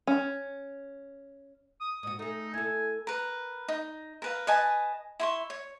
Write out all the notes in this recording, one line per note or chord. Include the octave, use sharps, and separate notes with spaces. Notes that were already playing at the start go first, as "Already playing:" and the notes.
C#4
D#6
G#2 F#4 D#6
A3 D#4 G#4
E4 A4 G#5
A#4 B4
D#4
A#4 B4 F5
B4 D#5 G#5 A5
E4 C6 C#6
C#5